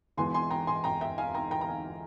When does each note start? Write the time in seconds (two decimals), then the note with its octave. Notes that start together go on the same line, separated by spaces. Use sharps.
0.17 E1 E2 E3 G#5 C6
0.34 G#5 C6
0.50 G5 A#5
0.67 G#5 C6
0.84 G5 A#5
1.01 E5 G5
1.18 F5 G#5
1.34 G5 A#5
1.51 G5 A#5
1.61 A#5
1.68 F5 G#5